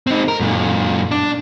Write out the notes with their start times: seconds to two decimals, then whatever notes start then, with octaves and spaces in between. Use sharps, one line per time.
0.07 C4 D#4
0.28 A#4
0.40 F#2 A#2
1.11 D4